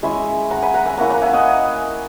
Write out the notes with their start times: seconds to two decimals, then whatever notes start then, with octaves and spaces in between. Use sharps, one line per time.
0.03 G#3 C#4 E4 E5 G#5
0.50 F#5 A#5
0.62 G#5 B5
0.74 F#5 A#5
0.85 E5 G#5
0.97 A#3 C#4 E4 F#5 A#5
1.10 F#5 A#5
1.22 E5 G#5
1.33 D#5 F#5